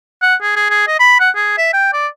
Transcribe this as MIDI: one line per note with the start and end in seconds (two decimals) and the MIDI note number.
0.22 0.35 78
0.42 0.54 68
0.56 0.65 68
0.70 0.87 68
0.88 0.95 75
0.99 1.17 83
1.20 1.30 78
1.36 1.53 68
1.58 1.72 76
1.73 1.90 79
1.93 2.07 74